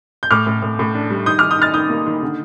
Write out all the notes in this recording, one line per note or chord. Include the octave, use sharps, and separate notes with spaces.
G6
A2 D6 F6
A2
A2
A2
D4
G3
D#3 D#6 G6
D#3 D6 F6
D#6 G6
D#4 F6 A6
D#3 D#6 G6
A#3
D#3
D3